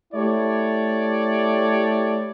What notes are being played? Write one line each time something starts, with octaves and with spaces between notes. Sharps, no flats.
A3 E4 G4 C#5 D5